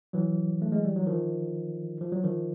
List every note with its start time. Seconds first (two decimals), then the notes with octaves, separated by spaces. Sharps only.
0.13 E3 F#3
0.62 A3
0.72 G#3
0.85 G3
0.96 F#3
1.06 D#3 F3
2.01 F3
2.12 F#3
2.24 D#3 F3